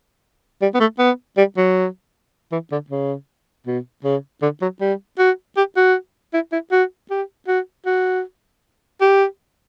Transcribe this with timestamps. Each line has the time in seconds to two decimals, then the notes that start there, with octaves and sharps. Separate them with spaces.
0.62 G3
0.74 B3
0.80 A3
0.99 B3
1.37 G3
1.57 F#3
2.52 E3
2.72 D3
2.90 C#3
3.67 B2
4.04 C#3
4.42 D3
4.61 F#3
4.81 G3
5.19 F#4
5.57 G4
5.77 F#4
6.34 E4
6.52 E4
6.72 F#4
7.10 G4
7.48 F#4
7.86 F#4
9.01 G4